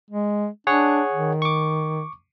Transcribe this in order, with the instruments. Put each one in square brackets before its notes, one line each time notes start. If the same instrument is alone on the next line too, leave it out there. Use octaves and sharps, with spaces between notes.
[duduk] G#3
[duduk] D4 [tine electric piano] G#4 C#5 F#5
[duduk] D#3
[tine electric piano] C#6 D6